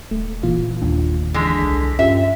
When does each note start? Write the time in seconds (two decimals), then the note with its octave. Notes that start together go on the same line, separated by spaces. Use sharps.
0.11 D#1 A3
0.43 F#1 A#2 E3 F4
0.82 D#2 A#3 D4
1.34 D3 E3 G#3 A#6 B6
1.63 C2
1.99 G2 C#4 F4 G4 E5